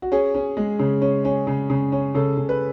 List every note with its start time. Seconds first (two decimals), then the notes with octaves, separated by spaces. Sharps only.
0.02 F#4
0.12 C#4 G#4
0.34 C#4
0.57 G#3
0.79 C#3
1.02 C#4
1.25 C#4
1.47 C#3
1.70 C#3
1.92 C#4
2.15 C#3 A4
2.37 C#3
2.49 B4